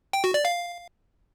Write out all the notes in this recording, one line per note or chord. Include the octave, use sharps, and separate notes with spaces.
G5
F#4
D5
F5